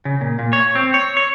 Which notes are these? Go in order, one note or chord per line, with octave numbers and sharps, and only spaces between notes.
C#3
A#2
A#2
C#5
C4
C#5
C#5